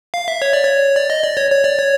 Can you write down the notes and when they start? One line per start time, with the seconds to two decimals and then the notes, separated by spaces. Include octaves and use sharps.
0.14 F5
0.28 E5
0.42 C#5
0.53 D5
0.64 C#5
0.96 D5
1.10 D#5
1.23 D5
1.37 C#5
1.51 C#5
1.64 D5
1.78 C#5